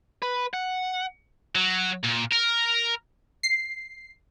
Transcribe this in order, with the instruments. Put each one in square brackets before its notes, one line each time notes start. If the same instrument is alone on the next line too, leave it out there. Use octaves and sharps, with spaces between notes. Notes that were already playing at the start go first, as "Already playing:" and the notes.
[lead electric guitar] B4
F#5
[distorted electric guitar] F#3
A#2
A#4
[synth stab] C7